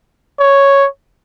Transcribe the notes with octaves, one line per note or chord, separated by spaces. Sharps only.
C#5